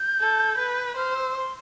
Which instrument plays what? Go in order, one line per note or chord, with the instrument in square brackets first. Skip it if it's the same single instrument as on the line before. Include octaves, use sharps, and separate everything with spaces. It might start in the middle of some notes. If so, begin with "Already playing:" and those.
Already playing: [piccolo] G6
[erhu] A4
B4
[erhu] C5 [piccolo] F6
[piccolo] E6
C6